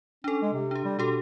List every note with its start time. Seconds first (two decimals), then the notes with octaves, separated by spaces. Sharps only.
0.24 C#4 D4 A4
0.41 G#3
0.53 C3
0.71 D4 G4
0.85 G3
0.99 B2 D4 G4 A4